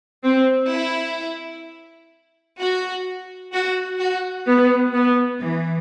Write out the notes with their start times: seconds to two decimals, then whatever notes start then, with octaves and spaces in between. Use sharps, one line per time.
0.24 C4
0.71 E4
2.59 F#4
3.53 F#4
4.00 F#4
4.47 B3
4.94 B3
5.40 E3